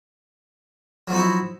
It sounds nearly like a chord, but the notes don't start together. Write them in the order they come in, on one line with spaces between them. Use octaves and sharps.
F#3 F3 D#4 F#4 E4